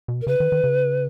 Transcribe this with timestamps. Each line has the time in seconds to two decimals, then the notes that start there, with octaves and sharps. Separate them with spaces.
0.08 B2
0.21 A#4
0.27 C#3 B4
0.40 D#3
0.52 D#3
0.64 C#3